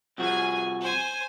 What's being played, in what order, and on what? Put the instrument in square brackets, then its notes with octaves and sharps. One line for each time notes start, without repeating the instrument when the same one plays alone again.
[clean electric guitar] C2 F3 F#4 [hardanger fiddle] G#4 G#5
[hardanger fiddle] C5 G#5